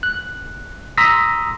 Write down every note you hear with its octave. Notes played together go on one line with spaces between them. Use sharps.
F#6
A#5 C6 D#6 E6 A#6 B6